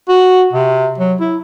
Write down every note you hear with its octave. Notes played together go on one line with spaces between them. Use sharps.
F#4
C3
F#3
E4